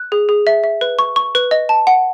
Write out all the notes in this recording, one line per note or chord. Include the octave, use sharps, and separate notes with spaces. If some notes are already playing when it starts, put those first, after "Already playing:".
Already playing: F#6
G#4
G#4
E5
E5
B4
C#6
C#6
B4
D#5
A5
F#5